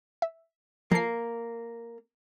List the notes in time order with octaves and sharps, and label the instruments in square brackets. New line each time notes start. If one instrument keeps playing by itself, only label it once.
[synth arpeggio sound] E5
[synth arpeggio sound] F3 A4 C7 [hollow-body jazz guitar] A#3